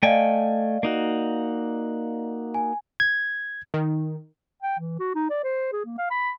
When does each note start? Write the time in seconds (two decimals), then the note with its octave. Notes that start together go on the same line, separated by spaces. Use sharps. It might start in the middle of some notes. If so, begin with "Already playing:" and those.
0.03 A3 D5 D#5 F5 G5 G#5
0.83 A#3 D#4 F#4
2.54 G#5
3.00 G#6
3.74 D#3
4.63 G5
4.79 E3
4.99 F#4
5.15 D#4
5.30 D5
5.44 C5
5.72 G#4
5.85 A#3
5.98 F5
6.10 B5